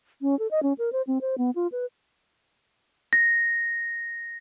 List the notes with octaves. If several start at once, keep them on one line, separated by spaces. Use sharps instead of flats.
C#4
A4
D#5
C#4
A#4
C5
C4
C5
B3
F4
B4
A#6